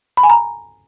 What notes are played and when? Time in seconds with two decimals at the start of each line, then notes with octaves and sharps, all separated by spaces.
0.17 B5
0.23 G#5
0.30 A#5